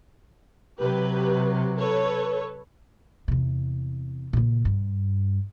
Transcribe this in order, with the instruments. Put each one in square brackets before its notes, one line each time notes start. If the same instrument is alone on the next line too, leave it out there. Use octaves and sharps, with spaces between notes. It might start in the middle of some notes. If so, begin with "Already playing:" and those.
[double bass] C3 F#3 [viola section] G4 B4
[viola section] A4 B4 C#5
[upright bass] E2 C3
A#2 C#3
G2